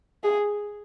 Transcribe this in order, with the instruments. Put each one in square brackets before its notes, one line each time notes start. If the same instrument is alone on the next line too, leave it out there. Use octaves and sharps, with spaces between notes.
[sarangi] G#4